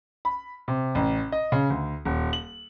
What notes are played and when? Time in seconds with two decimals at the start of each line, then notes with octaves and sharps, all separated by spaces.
0.25 B5
0.68 C3
0.95 A1
1.32 D#5
1.52 C#3
1.70 D2
2.05 D#1
2.33 F#7